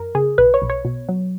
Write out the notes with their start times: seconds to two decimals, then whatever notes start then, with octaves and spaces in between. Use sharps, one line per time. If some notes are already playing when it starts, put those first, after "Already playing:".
Already playing: F#2 A#4
0.15 C#3 G#4
0.38 B1 B4
0.54 C#5
0.62 B1
0.70 C#5
0.85 B2
1.09 F#3